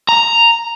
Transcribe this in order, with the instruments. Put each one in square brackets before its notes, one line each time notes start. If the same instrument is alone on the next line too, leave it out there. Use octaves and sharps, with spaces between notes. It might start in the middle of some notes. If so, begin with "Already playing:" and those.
[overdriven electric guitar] A#5